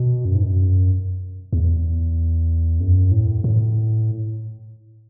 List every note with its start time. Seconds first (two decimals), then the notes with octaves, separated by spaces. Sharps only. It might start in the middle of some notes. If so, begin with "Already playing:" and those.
Already playing: B2
0.25 F#2
0.35 G#2
0.43 F#2
1.53 E2
2.80 F#2
3.12 A2
3.44 A2